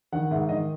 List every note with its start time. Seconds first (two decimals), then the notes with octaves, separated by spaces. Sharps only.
0.12 D#3 F#5
0.31 G#2 E5
0.49 D#3 D#5